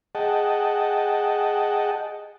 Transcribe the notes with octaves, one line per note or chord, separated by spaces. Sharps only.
G#4 D#5 F#5 G5 A5